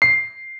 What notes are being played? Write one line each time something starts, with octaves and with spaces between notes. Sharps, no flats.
C7